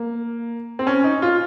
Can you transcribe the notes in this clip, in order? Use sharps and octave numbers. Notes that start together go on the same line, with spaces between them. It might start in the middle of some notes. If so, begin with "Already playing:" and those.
Already playing: A#3
C4
C#4
D#4
F4